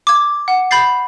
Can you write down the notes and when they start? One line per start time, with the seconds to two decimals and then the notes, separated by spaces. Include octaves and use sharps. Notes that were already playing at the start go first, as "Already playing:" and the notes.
0.07 D6 G#6
0.48 F#5
0.71 B5 G6 A6 C7